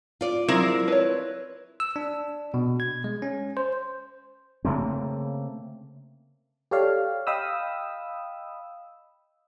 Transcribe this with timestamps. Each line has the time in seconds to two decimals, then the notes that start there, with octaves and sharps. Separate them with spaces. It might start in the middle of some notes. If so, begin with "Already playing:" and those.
0.21 F4 D5
0.48 F#3 G#3 C4 E4 A#4
0.88 B4 C#5
1.80 E6
1.96 D4
2.54 B2
2.80 G#6
3.04 G#3
3.22 C#4
3.57 C5
4.65 C#3 A3 A#3 C4
6.71 G4 A4 C#5 D5 F5
7.27 D#5 F5 G5 B5 D#6 E6